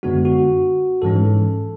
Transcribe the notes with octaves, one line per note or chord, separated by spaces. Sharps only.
F#2 D3 G#3 B3 D4 F#4
F#4
G#2 E3 G#3 C#4 A4